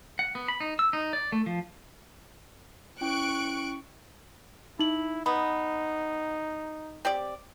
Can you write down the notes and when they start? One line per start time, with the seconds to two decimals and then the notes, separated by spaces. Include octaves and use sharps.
0.19 F#5
0.35 B3
0.48 B5
0.60 D#4
0.79 E6
0.93 D#4
1.13 D5
1.32 A3
1.46 F3
3.01 C#4 E4 G5 C#6 F#6 D7
4.79 D#4 E4 F#7
5.26 B3 D#4 B5
7.05 C4 G4 D5